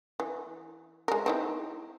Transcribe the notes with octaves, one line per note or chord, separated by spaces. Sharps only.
E3
G#3 A#4
C4 D#4 E4